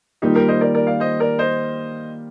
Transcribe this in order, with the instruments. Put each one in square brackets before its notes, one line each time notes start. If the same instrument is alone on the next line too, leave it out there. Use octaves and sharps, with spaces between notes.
[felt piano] D#3 G3 A#3 F4 [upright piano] D#4 G4
[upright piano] G4 A#4
C5 D#5
A#4 D5
A#4 D5
D5 F5
C5 D#5
A#4 D5
C5 D#5